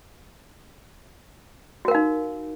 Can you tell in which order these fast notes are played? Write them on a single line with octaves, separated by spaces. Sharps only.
F#4 A#4 F5 D#4